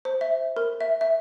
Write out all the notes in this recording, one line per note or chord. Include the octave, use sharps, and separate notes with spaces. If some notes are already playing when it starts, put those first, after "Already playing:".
C5
E5
A#4
E5
E5